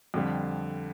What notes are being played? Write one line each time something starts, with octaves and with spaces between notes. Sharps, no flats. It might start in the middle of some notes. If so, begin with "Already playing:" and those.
F2 D3 G3